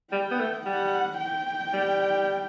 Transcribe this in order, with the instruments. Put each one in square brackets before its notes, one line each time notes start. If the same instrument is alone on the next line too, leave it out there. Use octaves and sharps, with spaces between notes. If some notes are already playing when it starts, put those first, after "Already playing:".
[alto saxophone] G3 [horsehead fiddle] G5
[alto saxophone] B3
A3
[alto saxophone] G3 [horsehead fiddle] F#5
[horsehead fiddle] G5
[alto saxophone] G3